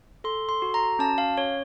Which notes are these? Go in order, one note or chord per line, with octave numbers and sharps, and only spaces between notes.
A4 C6
C6
F#4
A#5
C#4 A5
F5
C#4 C#5